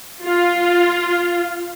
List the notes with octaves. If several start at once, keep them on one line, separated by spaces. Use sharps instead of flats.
F4